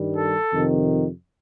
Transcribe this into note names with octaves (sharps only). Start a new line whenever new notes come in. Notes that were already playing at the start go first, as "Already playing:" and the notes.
Already playing: G2 D#3 G3
A4
F2 C3 D#3